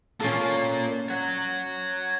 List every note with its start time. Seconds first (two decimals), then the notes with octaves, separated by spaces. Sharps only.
0.20 A#3 C#4 F4 A4
1.09 C#5 F#5